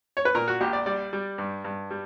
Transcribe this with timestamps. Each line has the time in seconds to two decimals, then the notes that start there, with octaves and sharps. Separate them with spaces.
0.17 C#5
0.25 B4
0.35 A#2 A#4
0.48 F#4
0.61 A#1 G4
0.73 D5
0.86 G3 D5
1.13 G3
1.38 G2
1.65 G2
1.91 G3